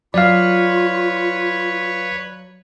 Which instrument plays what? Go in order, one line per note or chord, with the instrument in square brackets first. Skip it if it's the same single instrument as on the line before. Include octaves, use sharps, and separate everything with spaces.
[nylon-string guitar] F#3 [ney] F4 [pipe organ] B4 C#5 [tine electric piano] D5 F5